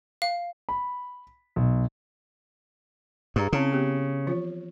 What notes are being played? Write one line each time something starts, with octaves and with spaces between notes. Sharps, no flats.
F5
B5
B1
G2 G#4 A#5
C#3 C4 C#4 E4
B3 G4
E3 F3 F4